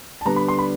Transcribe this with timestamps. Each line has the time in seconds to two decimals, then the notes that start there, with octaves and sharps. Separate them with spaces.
0.21 A5
0.25 D3 G3 B3 D4 A#5
0.36 B5
0.48 C6
0.59 B5